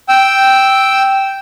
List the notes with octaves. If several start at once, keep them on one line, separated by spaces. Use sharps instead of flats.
G5 E6